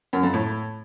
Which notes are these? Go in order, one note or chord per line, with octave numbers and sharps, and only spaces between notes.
F#2
F2
A2